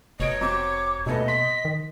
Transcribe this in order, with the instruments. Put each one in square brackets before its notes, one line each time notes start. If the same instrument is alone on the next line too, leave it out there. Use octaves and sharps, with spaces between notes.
[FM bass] F1 [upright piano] B2 D7 [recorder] C#5 [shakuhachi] D#5
[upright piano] F#3 C4 [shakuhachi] D6
[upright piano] D#1 A3 B4 [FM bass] B2 [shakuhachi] D#5
[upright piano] C6 [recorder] B6
[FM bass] D#3